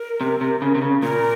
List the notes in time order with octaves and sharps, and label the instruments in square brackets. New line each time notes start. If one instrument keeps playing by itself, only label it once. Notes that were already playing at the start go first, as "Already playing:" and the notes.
Already playing: [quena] A#4
[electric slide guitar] C3
C3
C#3
C3
C#3
[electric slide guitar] A#2 [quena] A#4